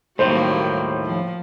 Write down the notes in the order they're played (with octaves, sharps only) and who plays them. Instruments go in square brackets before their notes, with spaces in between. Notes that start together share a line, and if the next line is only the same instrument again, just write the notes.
[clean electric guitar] D#2 A2 D#3 [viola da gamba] F#3 G3 A#3 [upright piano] C5
[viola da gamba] F3